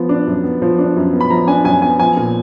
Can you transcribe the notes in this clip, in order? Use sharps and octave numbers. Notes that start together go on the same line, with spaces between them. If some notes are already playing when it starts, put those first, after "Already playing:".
Already playing: F3 B3
D4
F#2
B3
F3
D4
F#2
B3
B5
F3 A#5
D4 G#5
F#2 G#5
B3 G#5
F3 G#5
A#2